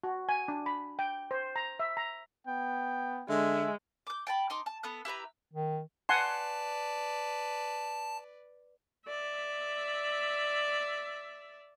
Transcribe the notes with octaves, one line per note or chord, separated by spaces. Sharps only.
F#4
G#5
D4
B5
G5
C5
A#5
E5
A#5
B3 G5
D3 G#3 E5
D6 G6
G5 A5 B5
D#4 C6 D6
A5
B3 A4 D#6 F#6
E4 G4 B4 A#5
D#3
B4 D5 F#5 G#5 A5 C6
D5 E5